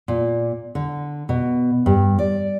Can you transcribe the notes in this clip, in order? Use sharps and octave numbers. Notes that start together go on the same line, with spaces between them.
A#2
D3
B2
G2
D5